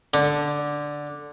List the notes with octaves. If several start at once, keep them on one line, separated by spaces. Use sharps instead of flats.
D3